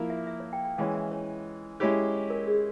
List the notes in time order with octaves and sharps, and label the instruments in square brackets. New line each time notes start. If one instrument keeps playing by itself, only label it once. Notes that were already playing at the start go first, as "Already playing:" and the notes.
Already playing: [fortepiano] F3 A#3 E4 A#4
[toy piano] E5
E5
C#5
G5
G5
[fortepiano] E3 G#3 C#4 [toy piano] F5
[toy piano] E5
C#5
[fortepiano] G#3 C#4 E4 G4
[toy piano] A#4
G#4